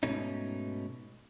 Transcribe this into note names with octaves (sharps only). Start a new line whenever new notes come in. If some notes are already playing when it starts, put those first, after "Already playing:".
G#2 B2 A3 C#4 D#4